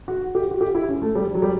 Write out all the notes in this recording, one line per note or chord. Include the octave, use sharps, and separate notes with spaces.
F#4
G4
F#4
G4
E4
C#4
A3
G3
F#3
G3